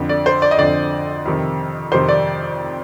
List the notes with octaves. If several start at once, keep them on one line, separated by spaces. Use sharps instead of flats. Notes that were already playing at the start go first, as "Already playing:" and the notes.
Already playing: F2 D3
D5
C5
D5
D#5
F2 D3 D5
F2 C3 D#3
F2 C3 D#3 C5
D5